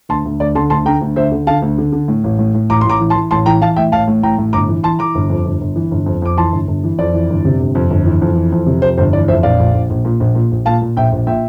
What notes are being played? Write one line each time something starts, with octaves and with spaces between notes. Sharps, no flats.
D2 A5 C6
D2
D2 D5
D3 A5 C6
D2 A5 C6
D3 G5 A#5
D2
D2 C5 E5
D3
D3 F5 A5
D2
D3
D3
A2
A1
A2
A2
A1 A#5 D6
A1 C6
A#5 D6
E3
A5 C6
E3
A1 A5 C6
E3 G5 A#5
E3 F5 A5
A2 E5 G5
A1 F5 A5
A2
A1 G5 A#5
A2
G1 A#5 D6
E3
E3 A5 C6
E3 A#5 D6
G1
F2
G1
G1
E3
G1
F2
F2 D6
E3 A5 C6
G1
G1
E3
F2 D5
E3
G1
C3
G1
F2
G1
E3
F2
E3
F2
C3
F2 C5
G1 C5
E3 D5
F2 C5 E5
A#1 D5 F5
A#1
A#1
A#1
A#2
A#1
A#2
A#1
A#2 F5 A5
A#2
A#1 E5 G5
A#1
A#2 E5 G5